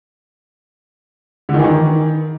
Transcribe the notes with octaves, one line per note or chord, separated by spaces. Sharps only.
D3
D#3
E3
D#3